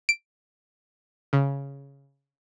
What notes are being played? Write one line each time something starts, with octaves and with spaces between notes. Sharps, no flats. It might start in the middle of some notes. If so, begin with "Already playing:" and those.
D7
C#3